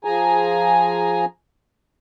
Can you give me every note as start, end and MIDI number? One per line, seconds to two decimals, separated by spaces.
0.05 1.25 53
0.05 1.25 68
0.05 1.25 80
0.05 1.25 82